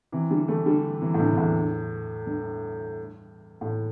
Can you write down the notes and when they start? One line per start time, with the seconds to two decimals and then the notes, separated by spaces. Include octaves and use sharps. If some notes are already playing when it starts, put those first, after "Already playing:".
0.12 C3 E3
0.31 D3 G3
0.48 E3 A3
0.66 D3 G3
1.02 C3 E3
1.14 A2
1.19 G2 C3
1.32 C3
1.38 E2 A2
2.27 G2
3.61 A2